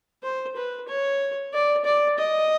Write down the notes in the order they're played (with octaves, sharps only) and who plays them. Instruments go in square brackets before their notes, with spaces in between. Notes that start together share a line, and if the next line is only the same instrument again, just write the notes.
[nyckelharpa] C5
B4
C#5
D5
D5
D#5